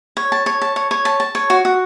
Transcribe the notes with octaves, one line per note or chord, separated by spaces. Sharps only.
C#5
A5
C#5
A5
C#5
C#5
A5
A5
C#5
F#4
F#4